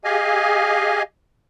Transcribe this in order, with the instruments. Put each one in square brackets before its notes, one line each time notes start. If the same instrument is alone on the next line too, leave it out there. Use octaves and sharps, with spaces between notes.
[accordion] G4 G#4 D#5 F5 G#5